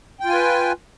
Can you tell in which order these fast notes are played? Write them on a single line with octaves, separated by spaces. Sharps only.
G5 F4 G#5 B4